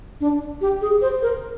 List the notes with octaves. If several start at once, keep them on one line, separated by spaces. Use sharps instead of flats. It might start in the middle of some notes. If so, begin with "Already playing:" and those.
D4
G4
G#4
C5
A#4